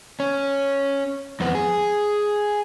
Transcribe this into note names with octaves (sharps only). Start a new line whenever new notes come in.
C#4
F2 B3
G#4